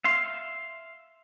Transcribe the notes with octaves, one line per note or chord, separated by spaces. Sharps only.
E5 F5 C6